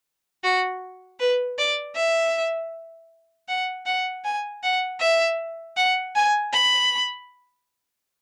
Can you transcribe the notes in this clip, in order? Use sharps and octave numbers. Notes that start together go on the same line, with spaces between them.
F#4
B4
D5
E5
F#5
F#5
G#5
F#5
E5
F#5
G#5
B5